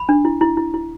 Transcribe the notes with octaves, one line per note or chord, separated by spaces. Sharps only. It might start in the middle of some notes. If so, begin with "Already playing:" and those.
Already playing: B5
D4
E4
E4
E4
E4